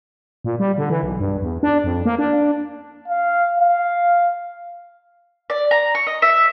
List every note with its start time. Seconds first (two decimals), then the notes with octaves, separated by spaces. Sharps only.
0.44 A#2
0.60 G3
0.78 D3
0.90 E3
1.03 B1
1.19 G2
1.42 E2
1.63 D4
1.84 F2
2.05 A#3
2.19 D4
3.08 F5
3.60 F5
5.50 D5
5.71 A#5
5.95 C#6
6.07 D#5
6.22 E5